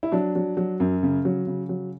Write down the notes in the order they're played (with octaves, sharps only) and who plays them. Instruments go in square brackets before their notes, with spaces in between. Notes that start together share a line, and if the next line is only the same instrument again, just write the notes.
[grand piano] E4
F#3 D4
F#3
F#3
F#2
C#3
F#3
C#3
F#3